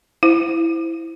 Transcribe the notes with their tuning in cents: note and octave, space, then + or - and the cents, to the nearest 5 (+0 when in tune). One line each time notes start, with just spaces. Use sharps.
E4 +0 C5 +0